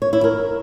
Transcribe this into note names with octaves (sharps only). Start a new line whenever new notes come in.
C#5
E4
A#4